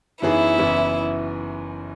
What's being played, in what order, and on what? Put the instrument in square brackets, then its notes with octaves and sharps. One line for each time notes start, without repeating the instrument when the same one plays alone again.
[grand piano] F#2 E3 B3 D#4 G#4 [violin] E4
[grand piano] F#1 F#2 E3 B3